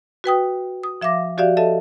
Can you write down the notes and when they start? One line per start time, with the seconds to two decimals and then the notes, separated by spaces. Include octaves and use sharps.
0.24 F#4 B4 G5 D#6
0.84 D#6
1.01 F3 E5 F5 D6 A#6
1.38 F3 F#4 G4 D5 E5 F5
1.57 A4 D#5 E5 A5